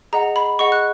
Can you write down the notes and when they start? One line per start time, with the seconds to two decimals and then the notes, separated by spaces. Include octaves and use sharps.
0.13 G#4 D#5 F#5 A#5
0.36 B5
0.59 G#4 D#5 F#5 C#6
0.72 F#6